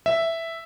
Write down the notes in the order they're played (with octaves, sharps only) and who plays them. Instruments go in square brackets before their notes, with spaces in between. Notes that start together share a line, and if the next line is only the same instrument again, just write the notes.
[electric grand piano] E5